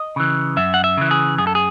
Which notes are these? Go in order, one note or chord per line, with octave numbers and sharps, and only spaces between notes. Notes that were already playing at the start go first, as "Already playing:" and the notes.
Already playing: D#5
C#3 E3
F#2 E5
F#5
E5
C#3 E3
G#4
F#2 G#4
A4
G#4